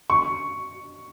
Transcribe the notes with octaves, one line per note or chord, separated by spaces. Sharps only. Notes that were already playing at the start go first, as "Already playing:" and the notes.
C#6